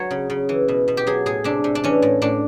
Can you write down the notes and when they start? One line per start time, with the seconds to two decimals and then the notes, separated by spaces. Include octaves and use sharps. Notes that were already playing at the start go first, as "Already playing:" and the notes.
Already playing: F#3 C#5
0.11 C#3
0.30 C#3
0.49 E3
0.68 B2
0.88 B2
0.97 G4
1.07 F#3 G#4
1.26 A2 G#4
1.44 C3 D4
1.64 C3
1.75 D4
1.84 E3 C#4
2.02 A2
2.22 A2 D4